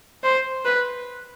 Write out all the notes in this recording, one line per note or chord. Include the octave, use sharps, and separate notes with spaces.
C5
B4